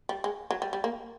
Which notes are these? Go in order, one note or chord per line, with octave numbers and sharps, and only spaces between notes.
G3
G#3
F#3
G3
G3
A#3